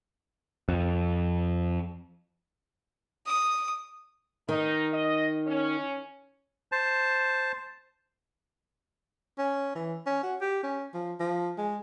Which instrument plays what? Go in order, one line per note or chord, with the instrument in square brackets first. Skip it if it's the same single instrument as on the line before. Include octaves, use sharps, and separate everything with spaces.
[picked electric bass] F2
[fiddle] D#6
[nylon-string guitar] D#3 [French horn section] D#4
[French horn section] D#5
C#4
[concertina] C5 A5
[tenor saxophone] C#4
E3
C#4
F#4
G4
C#4
F3
F3
G#3